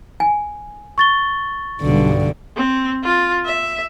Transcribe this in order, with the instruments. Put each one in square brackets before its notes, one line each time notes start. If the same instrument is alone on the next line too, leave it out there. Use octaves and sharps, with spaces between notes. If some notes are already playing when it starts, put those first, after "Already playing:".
[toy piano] G#5
[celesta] C#6 A6 G7
[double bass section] B1 G2 [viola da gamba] D3
[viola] C4
F4
E5